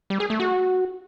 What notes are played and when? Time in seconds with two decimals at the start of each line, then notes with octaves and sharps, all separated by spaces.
0.10 G3
0.20 G#4
0.30 A3
0.40 F#4